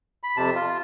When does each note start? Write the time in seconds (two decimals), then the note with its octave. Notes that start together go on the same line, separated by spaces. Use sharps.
0.23 B5
0.37 F2 C3 A5
0.55 F4